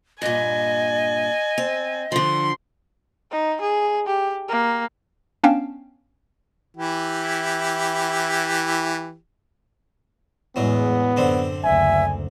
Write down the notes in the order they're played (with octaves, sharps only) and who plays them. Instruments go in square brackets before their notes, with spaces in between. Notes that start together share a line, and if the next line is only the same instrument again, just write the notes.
[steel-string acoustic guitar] G2 A#2 [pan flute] D#5 [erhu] G#5
[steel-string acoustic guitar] C4
[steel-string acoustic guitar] D3 F3 [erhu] C6
[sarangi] D#4
G#4
G4
A#3
[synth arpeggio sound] B3 C#4 D4 F5 G5 A5
[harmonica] E3 E4 G4
[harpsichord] E2 F#3 [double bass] A2 G#3 [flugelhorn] B3
[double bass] F#2 [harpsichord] D3 C4
[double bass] F#1 D2 [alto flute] E5 [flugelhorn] G#5